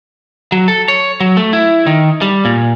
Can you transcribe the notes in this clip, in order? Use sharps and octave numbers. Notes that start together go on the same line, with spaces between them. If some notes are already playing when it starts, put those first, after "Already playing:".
F#3
A4
C#5
F#3
A3
E4
D#3
G3
A#2